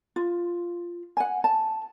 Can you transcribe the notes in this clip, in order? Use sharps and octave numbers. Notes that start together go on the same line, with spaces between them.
F4
F#5 G#5
A5